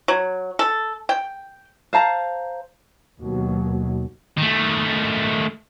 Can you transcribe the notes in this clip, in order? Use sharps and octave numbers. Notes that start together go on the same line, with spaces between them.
F#3
A4
G5
C5 F5 A5 A#5
D#2 B2 F#3
D#3 A3